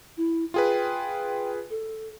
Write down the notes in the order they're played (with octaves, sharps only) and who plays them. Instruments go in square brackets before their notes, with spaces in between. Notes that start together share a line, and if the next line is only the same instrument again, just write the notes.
[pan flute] E4
[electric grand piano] F4 G#4 B4 [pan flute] G5
[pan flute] A4